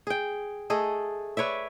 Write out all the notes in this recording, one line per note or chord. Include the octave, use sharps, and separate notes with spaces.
G#4 G5
A3 G#4 A4 D#5
B4 C#5 D5 E5